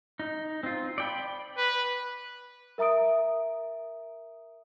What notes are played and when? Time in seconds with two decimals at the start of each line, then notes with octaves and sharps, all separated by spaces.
0.19 D#4
0.63 C4 F4
0.98 D5 G5 B5
1.58 B4
2.78 A#4 E5 A#5 D#6 D7